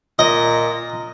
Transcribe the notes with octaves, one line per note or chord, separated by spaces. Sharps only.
A#2 D#5